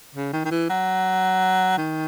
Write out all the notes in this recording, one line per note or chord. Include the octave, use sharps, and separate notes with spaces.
C#3
D#3
D#3
E3
F#3
D#3